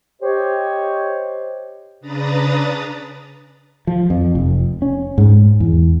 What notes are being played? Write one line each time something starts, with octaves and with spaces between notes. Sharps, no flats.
G4 C5 C#5 D#5
C#3 D4 B4 A#5 D#6 A6
F3
F2
F1
C#4
G#2
E2